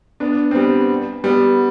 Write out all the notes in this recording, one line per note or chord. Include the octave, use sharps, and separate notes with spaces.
B3 D4
C4
G3 B3
G3 B3